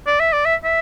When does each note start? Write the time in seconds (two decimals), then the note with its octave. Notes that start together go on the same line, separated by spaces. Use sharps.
0.07 D5
0.20 E5
0.33 D5
0.45 E5
0.64 E5